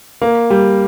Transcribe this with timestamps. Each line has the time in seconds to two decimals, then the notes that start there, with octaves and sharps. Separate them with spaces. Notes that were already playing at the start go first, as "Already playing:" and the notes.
0.21 A#3
0.50 G3